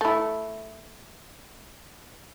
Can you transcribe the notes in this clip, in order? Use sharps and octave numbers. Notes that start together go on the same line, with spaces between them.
A3 E4